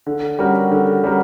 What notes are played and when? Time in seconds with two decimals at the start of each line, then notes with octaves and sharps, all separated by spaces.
0.06 D3
0.39 G3 C#4 F#4 A#4
0.71 D3
1.04 G3 C#4 F#4 A#4